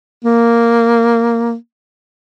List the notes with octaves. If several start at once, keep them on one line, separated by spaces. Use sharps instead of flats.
A#3